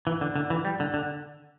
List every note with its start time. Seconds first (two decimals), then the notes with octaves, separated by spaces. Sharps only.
0.07 E3
0.21 D3
0.36 D3
0.50 E3
0.65 G3
0.80 D3
0.94 D3